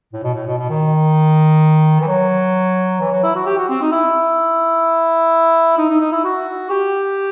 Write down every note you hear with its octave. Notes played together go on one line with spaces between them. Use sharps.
A2
B2
A2
B2
B2
D#3
E3
F#3
E3
F#3
E4
F#4
G4
F#4
C4
D#4
E4
D#4
D#4
D#4
E4
F#4
G4